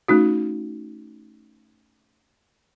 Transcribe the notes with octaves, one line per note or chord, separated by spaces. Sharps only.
A3 C#4 D#4 F#4